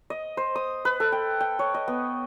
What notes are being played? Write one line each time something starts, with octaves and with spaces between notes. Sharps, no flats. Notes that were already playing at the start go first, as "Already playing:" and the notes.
D#5
C5
D#6
B4
A4
G5
G5
C#5
D#5
B3